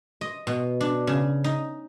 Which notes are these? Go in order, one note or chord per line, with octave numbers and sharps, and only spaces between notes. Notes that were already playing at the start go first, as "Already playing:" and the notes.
D#5
B2
D4
C#3
D#4